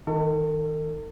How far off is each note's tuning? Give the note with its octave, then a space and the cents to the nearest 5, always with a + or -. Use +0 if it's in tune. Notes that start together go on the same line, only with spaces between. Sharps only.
D#3 +15 A4 +45